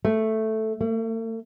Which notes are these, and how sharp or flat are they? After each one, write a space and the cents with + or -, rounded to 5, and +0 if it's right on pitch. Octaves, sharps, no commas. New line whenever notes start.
A3 +0
A3 +45